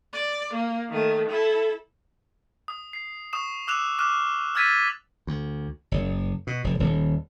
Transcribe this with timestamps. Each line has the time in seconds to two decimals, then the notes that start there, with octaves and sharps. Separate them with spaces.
0.13 D5
0.54 A#3
0.90 D#3 A3
1.28 E4 A4
2.68 D#6
2.93 C7
3.33 C#6 D#6 E7
3.67 D6 E6 F#6 E7 F7
3.99 D6 F6 F#6 E7
4.55 E6 F6 G#6 A6 B6 D#7
5.27 D2
5.92 F#1
6.47 B2
6.64 F1
6.79 D#1